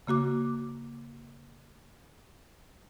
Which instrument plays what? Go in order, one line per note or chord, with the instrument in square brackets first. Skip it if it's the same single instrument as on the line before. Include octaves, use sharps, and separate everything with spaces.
[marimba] C#3 A#3 F#4 D6